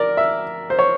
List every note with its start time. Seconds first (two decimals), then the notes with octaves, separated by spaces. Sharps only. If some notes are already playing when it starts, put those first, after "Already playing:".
Already playing: A#4 D5
0.17 E5
0.70 C5
0.79 C#5